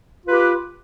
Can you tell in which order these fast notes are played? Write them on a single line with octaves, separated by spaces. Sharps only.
F4 B4 G4